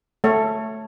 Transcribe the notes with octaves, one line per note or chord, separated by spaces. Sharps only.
A3 C#5